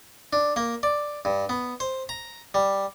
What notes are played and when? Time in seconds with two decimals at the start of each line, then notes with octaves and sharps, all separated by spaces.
0.33 D4
0.56 A#3
0.83 D5
1.25 G2
1.49 B3
1.80 C5
2.09 A#5
2.54 G3